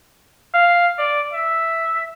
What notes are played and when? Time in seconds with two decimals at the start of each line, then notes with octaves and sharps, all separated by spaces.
0.54 F5
0.98 D5
1.33 E5